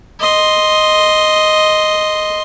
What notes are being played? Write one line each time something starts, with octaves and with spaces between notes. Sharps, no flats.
D#5 C6